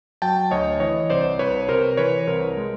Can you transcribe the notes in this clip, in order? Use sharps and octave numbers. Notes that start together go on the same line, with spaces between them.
F#3 G5 A5
D2 C#5 D#5
E3 C#5 D#5
C2 C5 D5
C2 B4 C#5
C3 A#4 C5
E3 B4 C#5
C2 A#4 C5
G#3